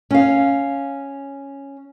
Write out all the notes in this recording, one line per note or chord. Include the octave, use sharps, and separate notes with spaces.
C#4 F5